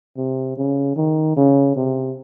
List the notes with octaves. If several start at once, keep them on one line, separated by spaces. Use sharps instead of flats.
C3
C#3
D#3
C#3
C3